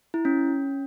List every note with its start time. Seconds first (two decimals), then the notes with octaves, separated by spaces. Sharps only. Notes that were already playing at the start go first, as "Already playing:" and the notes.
0.14 E4
0.25 C#4